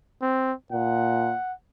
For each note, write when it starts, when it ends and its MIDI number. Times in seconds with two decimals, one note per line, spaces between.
0.22 0.53 60
0.72 1.33 46
0.72 1.53 78